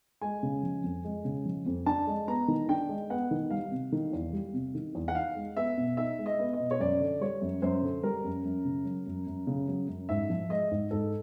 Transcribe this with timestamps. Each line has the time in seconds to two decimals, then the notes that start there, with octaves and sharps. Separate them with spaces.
0.21 G#3 G#5
0.43 C#3
0.63 F3
0.83 F2
1.05 G#3
1.25 C#3
1.45 F3
1.66 F2
1.86 D4 A5
2.07 G#3
2.28 B3 A#5
2.48 D#3
2.69 D4 G5
2.89 G#3
3.10 B3 F#5
3.31 D#3
3.50 G3 F5
3.71 C3
3.92 D#3
4.13 E2
4.33 G3
4.54 C3
4.75 D#3
4.95 E2
5.08 F#5
5.15 D#4 F5
5.36 G#3
5.57 B3 E5
5.77 B2
5.97 D#4 E5
6.19 G#3
6.26 D#5
6.39 B3
6.53 D#5
6.60 B2
6.71 C#5
6.80 F#2 D5
7.00 D3
7.21 G3 C#5
7.42 F#2
7.62 F#2 C5
7.83 D3
8.03 G3 A#4
8.24 F#2
8.45 F#2
8.65 C#3
8.85 F#3
9.07 F#2
9.27 F#2
9.47 C#3
9.68 F#3
9.88 F#2
10.09 G#2 E5
10.30 F3
10.50 G#3 D#5
10.71 G#2
10.91 G#2 A4